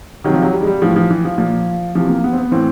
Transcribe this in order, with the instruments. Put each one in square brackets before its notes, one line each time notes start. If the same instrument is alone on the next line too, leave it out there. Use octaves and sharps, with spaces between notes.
[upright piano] C3 D#3 F#3
F3
F#3
G3
G#3
G3
A2 E3 F3
F3
E3
F3
A#2 F3
C3 E3 F3
A#3
B3
C4
B3
A2 E3 C4